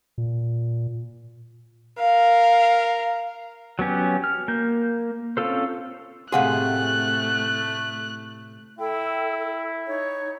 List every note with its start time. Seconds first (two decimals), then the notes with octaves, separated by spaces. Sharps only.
0.18 A#2
1.99 A#4 F5
3.79 F#3 B3 C#4 G4
4.24 F6
4.48 A#3 G6
5.37 C4 C#4 F4 A4 C5
6.32 A2 C3 A3 G#4 F5 F#5 C6 F#6
8.79 E4 A4 G5
9.87 D#4 C#5